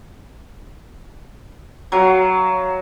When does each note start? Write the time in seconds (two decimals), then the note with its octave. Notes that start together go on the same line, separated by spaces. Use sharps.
1.92 F#3 F5